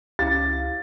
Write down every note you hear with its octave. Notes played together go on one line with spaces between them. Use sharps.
C#2 C#4 E4 G4 F5 A6